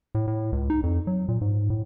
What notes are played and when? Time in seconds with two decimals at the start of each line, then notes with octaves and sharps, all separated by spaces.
0.15 A2
0.27 A2
0.52 C#2
0.70 D#4
0.83 F2
1.07 F#3
1.28 A#2
1.41 G#2
1.70 A2